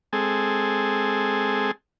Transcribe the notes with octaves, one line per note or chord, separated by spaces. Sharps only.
G#3 C4 G#4 A4